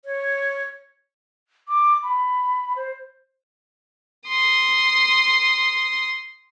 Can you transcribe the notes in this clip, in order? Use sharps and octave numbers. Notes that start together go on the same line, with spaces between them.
C#5
D6
B5
C5
C6 D#6